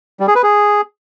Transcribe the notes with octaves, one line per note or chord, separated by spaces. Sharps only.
G3
G#4
B4
G#4